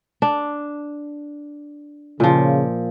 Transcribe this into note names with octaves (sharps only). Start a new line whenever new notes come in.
D4
A#2 C#3 F3